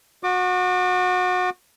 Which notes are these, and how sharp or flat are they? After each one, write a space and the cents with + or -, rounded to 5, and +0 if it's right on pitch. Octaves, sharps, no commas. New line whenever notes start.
F#4 -25 D6 +25